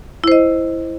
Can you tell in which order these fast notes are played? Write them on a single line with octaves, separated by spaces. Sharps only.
E4 C5 D#5